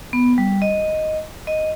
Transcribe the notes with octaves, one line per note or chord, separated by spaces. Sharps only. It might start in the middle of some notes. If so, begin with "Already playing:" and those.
B3
G3
D#5
D#5